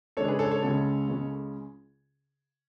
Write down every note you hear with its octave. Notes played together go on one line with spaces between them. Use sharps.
C#3 G#3 D4 A4 C#5
G#4 B4
A4 C#5
A4 C#5
C#2 C#3 G#3 C#4 A4 C#5
C#2 C#3 G#3 C#4